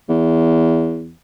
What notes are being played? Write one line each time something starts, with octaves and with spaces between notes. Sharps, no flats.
E2